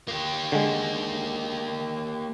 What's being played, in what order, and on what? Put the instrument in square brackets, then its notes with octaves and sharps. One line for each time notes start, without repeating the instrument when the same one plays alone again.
[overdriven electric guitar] A#3 G4
[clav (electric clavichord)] D3 G#3